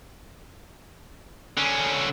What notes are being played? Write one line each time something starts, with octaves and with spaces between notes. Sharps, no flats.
D3 C#4